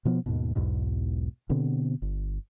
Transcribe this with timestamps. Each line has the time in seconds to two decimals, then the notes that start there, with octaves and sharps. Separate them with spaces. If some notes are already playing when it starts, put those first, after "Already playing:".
0.05 B2 F3 B3
0.26 D#2 G#2 B2
0.55 B1 E2 G#2 B2
1.49 B2 D3 B3 C4
2.02 G1